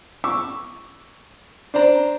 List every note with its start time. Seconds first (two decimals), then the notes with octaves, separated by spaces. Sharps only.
0.24 C#6 D6 E6
1.74 D4 C5 D5 A#5